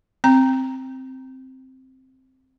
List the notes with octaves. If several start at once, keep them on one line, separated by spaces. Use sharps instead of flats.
C4 A#5